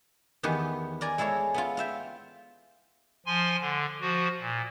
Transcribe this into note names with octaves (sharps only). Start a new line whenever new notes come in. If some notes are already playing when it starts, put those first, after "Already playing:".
E2 D#3 B3 G4 B4
A#4 D5 G#5
G#3 E4 A4 A#4 C#5
B3 E4 F4
F4 E5 G5
F3 G#5 C6
D3
F3 F#4
A#2